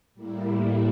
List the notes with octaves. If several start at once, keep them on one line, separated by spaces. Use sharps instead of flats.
A2 G3 A#3 E4